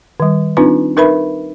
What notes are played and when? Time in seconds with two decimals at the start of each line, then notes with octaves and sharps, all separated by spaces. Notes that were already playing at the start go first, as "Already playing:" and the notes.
0.20 D#3 G3
0.57 C4 D4 D#4 F4 B4
0.97 D#4 A#4 B4 E5 B5